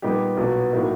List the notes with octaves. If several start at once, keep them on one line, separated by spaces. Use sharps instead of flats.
A#2 G3 B3 D#4 G4
B1 A#2 F#3 B3
A2 F#3 A#3 D#4